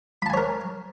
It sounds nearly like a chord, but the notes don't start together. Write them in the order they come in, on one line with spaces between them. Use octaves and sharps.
B5 A5 G#5 C#5 A#4